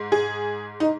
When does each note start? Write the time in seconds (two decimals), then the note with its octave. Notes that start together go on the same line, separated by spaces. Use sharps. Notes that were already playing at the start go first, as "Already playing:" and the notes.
Already playing: G#2
0.12 G#4
0.80 D#4